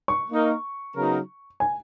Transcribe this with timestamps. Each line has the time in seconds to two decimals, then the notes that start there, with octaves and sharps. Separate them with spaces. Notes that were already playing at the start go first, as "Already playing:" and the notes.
0.08 C#6
0.29 A#3 D#4 A#4
0.95 C#3 F#3 B3 D#4 A#4
1.60 G#5